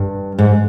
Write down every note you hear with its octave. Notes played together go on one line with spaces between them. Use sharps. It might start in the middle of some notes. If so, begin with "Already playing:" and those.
Already playing: G2
G#2